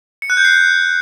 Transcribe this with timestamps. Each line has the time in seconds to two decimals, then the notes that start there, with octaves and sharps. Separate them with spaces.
0.22 C#7
0.30 F#6
0.37 G6
0.45 C7